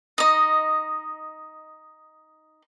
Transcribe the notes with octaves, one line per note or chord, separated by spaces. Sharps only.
D#4 D#5